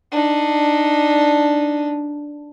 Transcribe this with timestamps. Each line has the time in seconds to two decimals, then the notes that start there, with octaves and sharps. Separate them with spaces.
0.11 D4 D#4